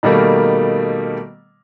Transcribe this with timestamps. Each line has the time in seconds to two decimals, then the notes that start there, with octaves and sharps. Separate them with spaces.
0.03 B2 D#3 G3 A3 A#3